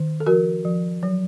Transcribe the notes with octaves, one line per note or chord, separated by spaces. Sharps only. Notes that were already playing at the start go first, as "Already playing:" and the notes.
Already playing: D#3
A4
F3 F#4 A#4
F3
F#3